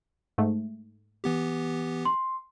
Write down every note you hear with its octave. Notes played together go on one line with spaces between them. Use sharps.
G#2 A3
E3 B3 G4
C6